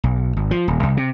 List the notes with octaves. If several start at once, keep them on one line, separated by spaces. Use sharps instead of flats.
B1
G#1
F3
D#1
C2
C3